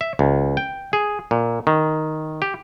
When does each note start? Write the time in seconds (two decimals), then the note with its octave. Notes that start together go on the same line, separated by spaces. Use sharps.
0.01 E5
0.19 C#2
0.57 G5
0.93 G#4
1.31 A#2
1.67 D#3
2.42 G4